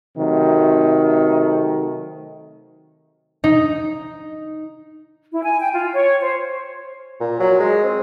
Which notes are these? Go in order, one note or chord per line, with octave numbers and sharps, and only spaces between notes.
C3 D#3 F#3 A3
D#4
E4
G#5
G5
F4
C#5
C5
A#2
F#3
G#3
C4